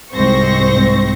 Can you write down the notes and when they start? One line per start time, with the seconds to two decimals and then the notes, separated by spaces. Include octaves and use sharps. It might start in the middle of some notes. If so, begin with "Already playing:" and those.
0.14 C2 G#2 C4 C5 C#6 A#6